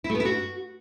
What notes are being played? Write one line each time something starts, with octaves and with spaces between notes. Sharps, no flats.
E4
A3
B3
E4
F#4